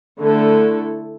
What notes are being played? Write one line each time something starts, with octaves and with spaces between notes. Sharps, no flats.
D3 A3 E4 A4